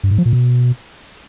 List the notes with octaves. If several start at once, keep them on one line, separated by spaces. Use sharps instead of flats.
G2
G#2
F3
A#2
B2